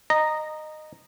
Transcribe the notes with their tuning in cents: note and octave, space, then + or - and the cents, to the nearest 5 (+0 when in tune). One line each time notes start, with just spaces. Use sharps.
D#5 -15 A#5 -5